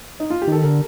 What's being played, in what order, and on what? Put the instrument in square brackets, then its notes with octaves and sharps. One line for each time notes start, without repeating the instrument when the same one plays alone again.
[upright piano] D#4
F4
G4
[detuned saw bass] D#3 [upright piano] A4
[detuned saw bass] D3 [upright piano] A#4